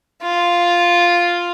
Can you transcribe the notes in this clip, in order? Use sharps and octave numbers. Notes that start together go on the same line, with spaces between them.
F4